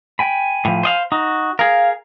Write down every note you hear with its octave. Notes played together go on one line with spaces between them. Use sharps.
G5 G#5 B5
A2 F3
C5 D#5 F5
D#4 F#4
G#4 A#4 F5